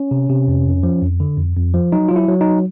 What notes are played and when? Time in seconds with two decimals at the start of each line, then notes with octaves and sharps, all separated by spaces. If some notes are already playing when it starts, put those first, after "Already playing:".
Already playing: C#4
0.11 C3
0.29 C3
0.48 F2
0.66 F2
0.83 F3
1.02 F2
1.20 D3
1.37 F2
1.56 F2
1.74 F3
1.92 F#3 D#4
2.08 F#3 F4
2.16 E4
2.28 F#3
2.41 D#4